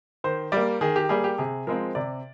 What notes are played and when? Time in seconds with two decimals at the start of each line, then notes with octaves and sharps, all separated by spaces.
0.24 D#3 C5
0.52 G3 A#3 D5
0.81 D#3 G#4
0.96 G4
1.09 G3 A#3 G#4
1.24 G4
1.38 C3 G#4
1.67 F3 G#3 C4 A#4
1.95 C3 D5